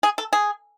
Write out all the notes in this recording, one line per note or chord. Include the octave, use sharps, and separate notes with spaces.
G#4
A4
G#4